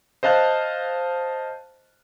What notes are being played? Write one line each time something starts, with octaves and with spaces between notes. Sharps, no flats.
C5 D#5 F5 A5 F#6